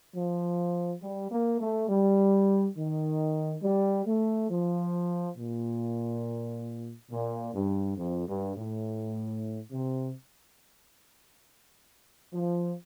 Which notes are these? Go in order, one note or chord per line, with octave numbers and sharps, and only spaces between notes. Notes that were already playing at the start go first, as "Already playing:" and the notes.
F3
G3
A#3
A3
G3
D#3
G3
A3
F3
A#2
A#2
G2
F2
G2
A2
C3
F3